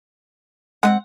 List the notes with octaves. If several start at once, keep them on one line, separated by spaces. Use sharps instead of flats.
G#3 C4 D#4 F#5